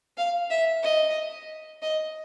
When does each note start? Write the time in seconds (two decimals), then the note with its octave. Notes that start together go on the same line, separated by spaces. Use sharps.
0.17 F5
0.50 E5
0.83 D#5
1.82 D#5